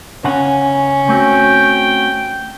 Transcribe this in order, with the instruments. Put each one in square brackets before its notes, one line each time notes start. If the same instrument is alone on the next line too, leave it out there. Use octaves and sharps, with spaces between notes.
[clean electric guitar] C#3 F#5 [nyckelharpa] C#4
[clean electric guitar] A3 C4 F#4 [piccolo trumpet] G5